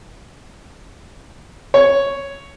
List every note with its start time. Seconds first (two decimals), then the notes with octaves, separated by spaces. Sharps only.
1.74 C#5